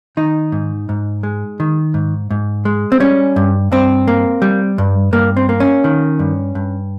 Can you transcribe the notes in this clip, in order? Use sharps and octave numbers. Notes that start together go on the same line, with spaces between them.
D#3 D#4
G#2
G#2
G#3
D#3
G#2
G#2
G#3
C4
G3 C#4
G2
G2 C4
A#3
G3
G2
G2 A#3
C4
A#3
C#4
D#3
G2
G2